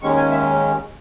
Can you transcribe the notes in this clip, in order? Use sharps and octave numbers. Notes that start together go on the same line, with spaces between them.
D#2 D#3 G#3 C#4 C#6
G#5
E5